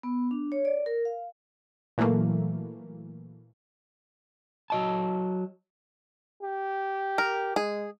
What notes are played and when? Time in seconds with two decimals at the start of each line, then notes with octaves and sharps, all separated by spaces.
0.03 B3
0.31 D4
0.52 C#5
0.65 D5
0.86 A#4
1.05 F5
1.98 A#2 E3 F#3 A3 A#3
4.70 F#3 D#5 A5
6.43 G4
7.18 A#4
7.56 G#3 G#4